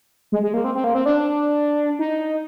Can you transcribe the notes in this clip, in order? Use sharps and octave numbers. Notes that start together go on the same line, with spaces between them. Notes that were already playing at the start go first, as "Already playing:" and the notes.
G#3
G#3
A#3
C4
C4
A#3
C4
D4
D#4